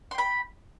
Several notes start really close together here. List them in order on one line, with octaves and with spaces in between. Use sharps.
C6 G5 B5